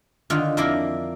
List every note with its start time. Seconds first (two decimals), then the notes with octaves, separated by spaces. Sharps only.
0.30 D3 D#3 F4
0.57 F2 A#3 E4 A#4 D5